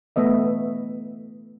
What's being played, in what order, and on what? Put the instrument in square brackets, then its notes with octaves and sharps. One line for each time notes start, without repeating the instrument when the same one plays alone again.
[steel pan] A3 B3 D#5 E5